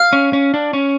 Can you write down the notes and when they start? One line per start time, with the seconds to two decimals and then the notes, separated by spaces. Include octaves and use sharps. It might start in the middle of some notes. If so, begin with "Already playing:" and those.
Already playing: F5
0.13 C#4
0.33 C#4
0.54 D4
0.73 C#4